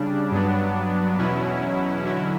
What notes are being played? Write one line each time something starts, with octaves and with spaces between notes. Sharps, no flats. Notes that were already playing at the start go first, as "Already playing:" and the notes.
Already playing: C#3 G3 D4
G2 F#3 B3 D4
E2 B2 F#3 C#4 E4
D3 F#3 C#4 E4